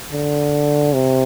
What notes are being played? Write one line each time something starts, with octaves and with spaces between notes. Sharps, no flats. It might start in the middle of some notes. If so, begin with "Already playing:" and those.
D3
C3